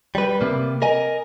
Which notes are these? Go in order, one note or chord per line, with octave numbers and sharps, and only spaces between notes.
G3 B4
C3 A#3
A#4 D#5 G#5